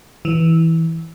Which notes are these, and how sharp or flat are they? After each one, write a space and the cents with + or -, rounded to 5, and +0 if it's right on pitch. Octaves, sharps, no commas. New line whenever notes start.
E3 -15